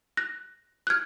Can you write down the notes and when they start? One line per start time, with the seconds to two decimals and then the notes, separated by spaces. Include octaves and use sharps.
0.17 F#6 A#6
0.87 F#6
0.90 F6 G#6